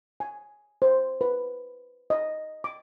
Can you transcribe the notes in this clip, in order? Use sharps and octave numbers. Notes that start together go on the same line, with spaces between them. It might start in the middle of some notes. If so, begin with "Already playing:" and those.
G#5
C5
B4
D#5
D6